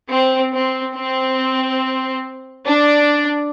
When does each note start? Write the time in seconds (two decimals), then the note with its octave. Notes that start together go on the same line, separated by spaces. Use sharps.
0.11 C4
0.53 C4
0.96 C4
2.67 D4